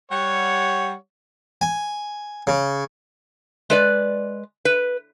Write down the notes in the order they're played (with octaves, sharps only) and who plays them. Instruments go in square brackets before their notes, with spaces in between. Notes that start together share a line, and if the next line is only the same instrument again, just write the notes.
[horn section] G3 F#5 [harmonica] C#5
[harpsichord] G#5
C#3
[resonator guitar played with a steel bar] G#3 B4 D5
B4